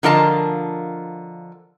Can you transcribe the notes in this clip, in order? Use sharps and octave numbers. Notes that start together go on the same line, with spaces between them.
D3 F3 F4 A#4 D#5 A5